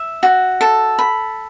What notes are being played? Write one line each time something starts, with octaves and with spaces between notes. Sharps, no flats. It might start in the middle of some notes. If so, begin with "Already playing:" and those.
Already playing: E5
F#4
A4
B5